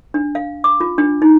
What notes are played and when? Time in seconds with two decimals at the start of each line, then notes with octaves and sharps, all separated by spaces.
0.14 D4
0.35 F5
0.64 D6
0.80 F4
0.98 D4
1.22 D#4